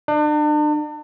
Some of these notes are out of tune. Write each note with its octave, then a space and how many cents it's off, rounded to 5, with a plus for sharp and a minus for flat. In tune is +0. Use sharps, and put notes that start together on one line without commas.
D4 +40